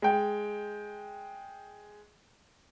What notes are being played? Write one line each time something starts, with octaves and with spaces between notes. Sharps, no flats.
G#3 G5